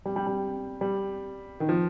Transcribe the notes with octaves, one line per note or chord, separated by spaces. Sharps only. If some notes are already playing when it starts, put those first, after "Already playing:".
G3
G3
G3
G3
D#3
F3